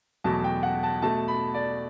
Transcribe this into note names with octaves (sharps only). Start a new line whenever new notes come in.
E2 B2 F#3 A3 A5
G5
F#5
A5
B2 A3 A5
B5
D5